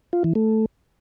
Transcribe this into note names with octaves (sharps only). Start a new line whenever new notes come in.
F4
E3
A3